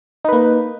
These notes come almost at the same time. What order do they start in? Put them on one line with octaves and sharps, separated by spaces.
D#4 B4 A#3